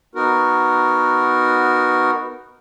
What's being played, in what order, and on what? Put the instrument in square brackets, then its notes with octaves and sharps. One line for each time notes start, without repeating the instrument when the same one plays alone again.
[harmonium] B3 D#4 F#4 A#4